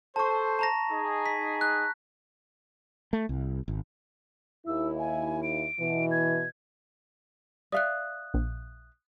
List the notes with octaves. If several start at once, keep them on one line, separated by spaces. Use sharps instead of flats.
A4 C5 A5 C#6
A5 A#5 A#6
D#4 G#4
B6
F#6
A3
C2
G#1
D#2 E4 E6
G#5
D7
B2 E3
G#6
D5 E5 F5 D#6 F#6
A#1